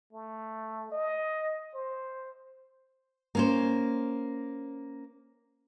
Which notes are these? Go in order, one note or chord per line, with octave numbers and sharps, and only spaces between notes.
A3
D#5
C5
A#3 C#4 C5